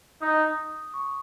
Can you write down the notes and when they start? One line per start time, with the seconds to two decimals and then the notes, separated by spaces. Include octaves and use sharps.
0.22 D#4 D#6
0.94 C#6